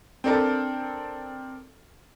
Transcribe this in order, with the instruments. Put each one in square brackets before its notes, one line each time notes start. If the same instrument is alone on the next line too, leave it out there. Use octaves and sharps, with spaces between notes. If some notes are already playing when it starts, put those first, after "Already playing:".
[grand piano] C4 D4 A4 A#4 A5